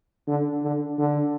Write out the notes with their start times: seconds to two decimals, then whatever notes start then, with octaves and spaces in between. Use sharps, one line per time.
0.27 D3
0.63 D3
0.98 D3